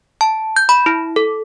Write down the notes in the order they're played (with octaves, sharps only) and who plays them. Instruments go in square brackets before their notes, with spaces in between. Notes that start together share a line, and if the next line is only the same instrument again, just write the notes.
[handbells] A5
G6
B5
E4
A4